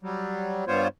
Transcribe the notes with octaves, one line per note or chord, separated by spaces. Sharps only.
F#3 G3
G2 G3 B3 F4 C5 C#5